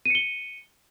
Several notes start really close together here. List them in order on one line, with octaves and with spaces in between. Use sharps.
D#7 C#7 G7